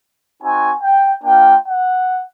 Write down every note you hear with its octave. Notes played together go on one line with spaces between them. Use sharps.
C4 D#4 F#4 G#5
G5
A#3 D4 F4 G5
F#5